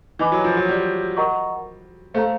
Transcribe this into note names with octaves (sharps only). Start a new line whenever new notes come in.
E3 B4 D#5 G#5 B5 D6
F#3
F3
F#3
G3
A#4 D#5 F#5 A#5 C#6
A3 C5 F5 A#5